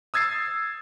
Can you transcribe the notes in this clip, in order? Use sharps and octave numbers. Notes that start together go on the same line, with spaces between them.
D#6 E6 G#6 A6 C7